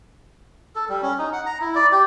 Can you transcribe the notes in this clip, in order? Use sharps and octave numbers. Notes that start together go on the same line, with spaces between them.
A4
G3
C#4
D#4
F#5
A#5
E4
D5
G4